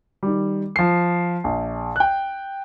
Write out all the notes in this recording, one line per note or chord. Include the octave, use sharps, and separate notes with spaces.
D#3 G3
F3 C7
A#1
G5 F#6